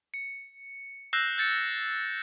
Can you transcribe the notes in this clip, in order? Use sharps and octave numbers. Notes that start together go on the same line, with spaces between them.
C#7
E6 F#6 G6 A#6 C7 E7
G6 A6 C#7